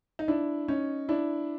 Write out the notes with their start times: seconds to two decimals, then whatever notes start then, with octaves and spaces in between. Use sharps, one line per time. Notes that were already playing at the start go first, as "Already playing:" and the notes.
0.19 D#4
0.28 D4 E4
0.68 C#4 D#4
1.09 D4 E4